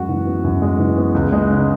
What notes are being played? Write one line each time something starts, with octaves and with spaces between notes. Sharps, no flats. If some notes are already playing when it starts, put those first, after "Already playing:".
Already playing: F#2 G#3 F#4
E3
B3
F#2
G#3
E3
B3
C#2
G#3
C#3